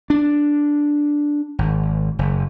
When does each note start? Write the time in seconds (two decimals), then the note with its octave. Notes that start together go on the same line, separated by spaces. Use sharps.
0.10 D4
1.59 G#1
2.19 F#1